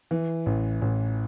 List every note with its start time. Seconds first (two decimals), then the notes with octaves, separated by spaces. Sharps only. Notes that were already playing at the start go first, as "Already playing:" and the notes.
0.11 E3
0.46 A1
0.82 A1